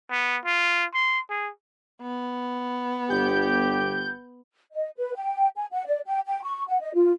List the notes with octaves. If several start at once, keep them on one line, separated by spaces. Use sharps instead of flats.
B3
F4
C6
G#4
B3
G1 G4 G6
D#5
B4
G5
G#5
F#5
D5
G5
G5
C#6
F#5
D#5
F4